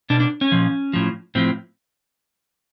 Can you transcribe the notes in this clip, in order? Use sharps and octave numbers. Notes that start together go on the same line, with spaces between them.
B2 D4
D4
C#4
A#2 F3
A2 F3
A2 F3 C4